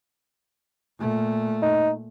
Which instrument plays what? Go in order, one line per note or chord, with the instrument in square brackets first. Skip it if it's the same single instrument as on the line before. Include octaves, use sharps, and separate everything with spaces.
[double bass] A#2 A3
[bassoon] D#4